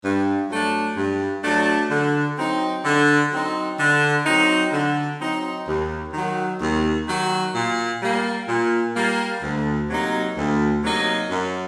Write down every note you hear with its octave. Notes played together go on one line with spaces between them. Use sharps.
G2
F#3 A3 D4
G2
F#3 A3 D4
D3
F#3 C4 D#4
D3
F#3 C4 D#4
D3
F#3 C4 D#4
D3
F#3 C4 D#4
D#2
D#3 F#3
D#2
D#3 F#3
A#2
G3 A#3
A#2
G3 A#3
D2
C3 F#3 A#3 D#4
D2
C3 F#3 A#3 D#4
F#2